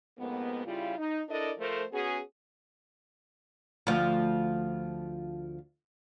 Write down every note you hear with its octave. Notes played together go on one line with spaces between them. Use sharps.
F2 G#2 A#3 B3
C#3 G3 E4 F4
D#4
D4 E4 A4 A#4 D5 D#5
F3 A3 A4 A#4 C5
B3 C#4 F#4 G#4
D2 F3